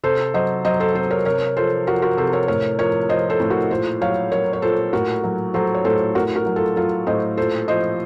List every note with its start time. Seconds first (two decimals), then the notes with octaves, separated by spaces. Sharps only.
0.03 C3 A4 C5
0.34 F#3 C5 D#5
0.65 F#3 C5 D#5
0.80 A4 C5
0.95 C3 A4 C5
1.10 A#4 C#5
1.25 C3 A#4 C#5
1.56 F3 A4 C5
1.87 F3 F#4 A#4
2.02 F#4 A#4
2.17 C3 A4 C5
2.33 A#4 C#5
2.48 A2 A#4 C#5
2.79 F3 A#4 C#5
3.09 F3 C5 D#5
3.30 A4 C5
3.40 A2
3.50 F#4 A#4
3.71 A#2 A4 C5
4.01 F#3 C#5 F5
4.32 F#3 A#4 C#5
4.53 C#5
4.62 A#2 A4 C5
4.93 A2 F#4 A#4
5.23 F#3
5.54 F#3 A4 C5
5.74 C#5
5.85 A2 A4 C5
6.15 A2 F#4 A#4
6.36 F#4 A#4
6.46 F#3
6.56 F4 A4
6.76 F#3 F4 A4
7.07 A2 C5 D#5
7.37 A#2 A4 C5
7.68 F3 C5 D#5